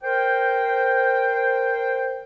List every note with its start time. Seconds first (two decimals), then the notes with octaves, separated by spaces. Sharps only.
0.04 A#4 C5 G5